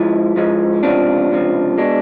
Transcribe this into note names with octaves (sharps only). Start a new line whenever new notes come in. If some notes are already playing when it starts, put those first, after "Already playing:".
Already playing: G#2 F3 G#3 E4
G#2 F3 G#3
C#2 C3 F3 D4
C#2 C3 F3
B2 G#3 D4